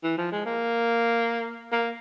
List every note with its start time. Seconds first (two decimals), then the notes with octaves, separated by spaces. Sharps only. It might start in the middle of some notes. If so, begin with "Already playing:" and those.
0.04 E3
0.18 F3
0.32 G#3
0.46 A#3
1.72 A#3